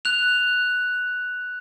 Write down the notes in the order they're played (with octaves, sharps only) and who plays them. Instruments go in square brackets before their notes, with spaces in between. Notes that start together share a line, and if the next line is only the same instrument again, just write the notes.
[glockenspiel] F#6 F7